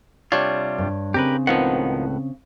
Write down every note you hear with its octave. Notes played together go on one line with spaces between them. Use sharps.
C3 G3 D4 F4 C#5
G2
C#3 C4 G4 A#4 B4
C#2 A2 D#3 F3 B3 F#5